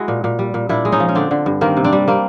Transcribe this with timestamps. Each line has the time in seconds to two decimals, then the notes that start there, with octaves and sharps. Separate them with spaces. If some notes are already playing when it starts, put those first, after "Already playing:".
Already playing: G#3 E4 F#4
0.08 A#2
0.24 A#2
0.39 G3
0.54 A#2
0.69 A#2 D4 E4
0.85 G#3
0.92 C#4 D#4
1.00 F3
1.09 C#4
1.15 D3 C4 D4
1.31 D3
1.46 G2
1.61 D#3 A#3 C4
1.77 C3
1.84 C4 D4
1.92 G3
2.08 A#3 C4